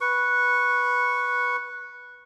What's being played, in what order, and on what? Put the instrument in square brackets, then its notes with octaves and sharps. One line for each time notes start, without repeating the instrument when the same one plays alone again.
[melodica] B4 C#6